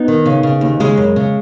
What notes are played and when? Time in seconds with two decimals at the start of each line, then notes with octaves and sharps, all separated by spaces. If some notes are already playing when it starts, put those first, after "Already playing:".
Already playing: B3 D#4
0.08 D#3
0.26 C#3
0.43 C#3
0.61 D#2
0.80 C#3 G#3
0.97 F#2
1.16 C#3